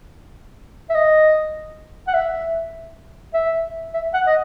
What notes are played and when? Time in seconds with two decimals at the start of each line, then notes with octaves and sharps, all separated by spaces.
0.90 E5
0.95 D#5
2.08 F#5
2.14 E5
3.34 E5
3.94 E5
4.14 F#5
4.27 D#5